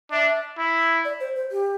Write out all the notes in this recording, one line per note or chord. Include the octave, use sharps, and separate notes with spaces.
D4 E5
E4
D5
C5
C5
G4